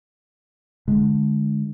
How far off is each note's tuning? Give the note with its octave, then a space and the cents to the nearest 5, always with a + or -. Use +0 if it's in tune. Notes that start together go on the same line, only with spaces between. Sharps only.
D3 +10 G#3 +15